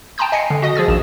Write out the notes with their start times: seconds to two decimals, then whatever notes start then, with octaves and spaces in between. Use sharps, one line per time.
0.18 G5 A5 A#5 C6 D#6 G6
0.32 D#5 G#5 A#6 C7 C#7
0.50 D3
0.62 F#4 D#5 D#6
0.75 F3 G#4 E6 A6
0.88 A#1 D#3 E7